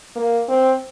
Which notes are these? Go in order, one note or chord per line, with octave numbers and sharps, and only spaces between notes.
A#3
C4